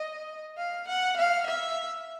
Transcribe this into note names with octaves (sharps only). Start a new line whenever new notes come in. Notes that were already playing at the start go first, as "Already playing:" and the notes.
Already playing: D#5
F5
F#5
F5
E5